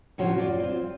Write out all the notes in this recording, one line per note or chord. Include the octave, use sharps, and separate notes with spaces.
A2 C3 F3 C#4 F#4 C#5
F4 D5
C4 F4